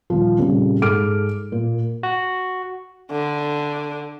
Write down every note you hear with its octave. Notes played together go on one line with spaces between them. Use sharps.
D#1 F3
F2 A#2 C#3 G3
G#2 G#4 A4 D6 F6 D7
A#2
F#4
D3